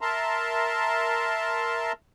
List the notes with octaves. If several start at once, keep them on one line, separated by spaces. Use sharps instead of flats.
A#4 E5 A5 A#5 C6